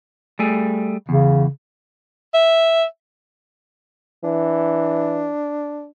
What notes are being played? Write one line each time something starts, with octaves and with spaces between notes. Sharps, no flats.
G3 A3 G#4
E2 C#3
E5
E3 D4